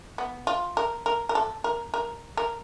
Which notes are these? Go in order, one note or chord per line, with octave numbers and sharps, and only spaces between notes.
B3
F4
A#4
A#4
A#4
A4
A#4
A#4
A#4